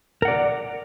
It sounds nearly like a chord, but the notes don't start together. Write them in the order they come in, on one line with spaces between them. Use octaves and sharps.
A#4 F#5 D5